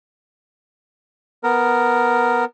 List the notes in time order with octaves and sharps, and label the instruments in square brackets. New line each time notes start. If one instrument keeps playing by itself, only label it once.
[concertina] B3 A#4